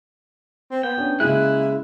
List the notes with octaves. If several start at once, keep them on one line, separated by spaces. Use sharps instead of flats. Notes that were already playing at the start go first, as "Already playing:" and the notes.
C4
B3 G5
C#4 D4
C#3 G#3 A#3 E4 G#5 F#6